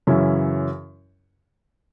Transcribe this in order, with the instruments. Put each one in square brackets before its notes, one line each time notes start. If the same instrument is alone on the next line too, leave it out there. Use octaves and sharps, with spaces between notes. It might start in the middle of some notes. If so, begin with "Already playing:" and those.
[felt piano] F#2 C#3 E3 C#4 E4